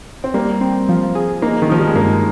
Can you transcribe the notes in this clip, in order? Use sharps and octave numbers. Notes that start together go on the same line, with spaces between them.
C4
G3 A#3
C4
F3
G#4
A#3 D#4
D#3
F3 D#4
G3
G#3
G2 A#3